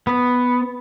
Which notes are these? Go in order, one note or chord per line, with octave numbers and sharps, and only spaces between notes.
B3